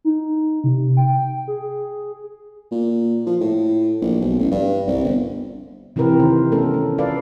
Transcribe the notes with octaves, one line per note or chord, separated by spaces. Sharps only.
D#4
C3
G5
G#4
A#2
F3
A2
A#1
B1
A1
G2
C2
G1
C3 E3 C4 G4 A#4 B4
D#3 C5
A3 B3 C#4 A4 A#4
C#4
F4 A4 B4 D5 F5